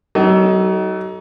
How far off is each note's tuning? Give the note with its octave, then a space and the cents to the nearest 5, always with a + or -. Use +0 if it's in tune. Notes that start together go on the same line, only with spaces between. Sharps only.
F#3 +40 D#4 +25 A4 +0